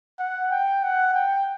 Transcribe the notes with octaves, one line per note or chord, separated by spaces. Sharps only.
F#5
G5
F#5
G5